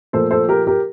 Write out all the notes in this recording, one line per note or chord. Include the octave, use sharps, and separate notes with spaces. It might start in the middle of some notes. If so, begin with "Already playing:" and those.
A#2 F3 A3 A4 C5
A4 C5
G4 A#4
G4 A#4